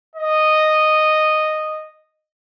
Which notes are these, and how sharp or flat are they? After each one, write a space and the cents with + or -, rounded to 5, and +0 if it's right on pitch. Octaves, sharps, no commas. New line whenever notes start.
D#5 -10